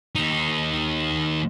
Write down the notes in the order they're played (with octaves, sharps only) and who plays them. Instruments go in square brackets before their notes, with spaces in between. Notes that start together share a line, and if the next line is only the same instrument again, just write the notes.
[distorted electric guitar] D#2 D#4